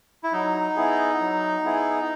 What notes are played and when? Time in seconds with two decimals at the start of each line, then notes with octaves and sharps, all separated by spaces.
0.23 E4
0.33 F#3 D#4
0.76 B3 E4 G#4
1.21 F#3
1.64 B3 E4 G#4